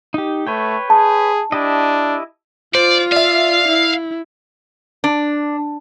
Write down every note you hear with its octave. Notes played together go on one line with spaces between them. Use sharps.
D#4 G4
A3 B4 C#5 G5
G#4 A5
D4 E4 G4 D#5
F4 C5 D5
D5 E5 F5
E4
D4